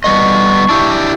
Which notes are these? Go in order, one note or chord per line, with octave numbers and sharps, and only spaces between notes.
G3 B3 D#5 C#6
D4 E4 G4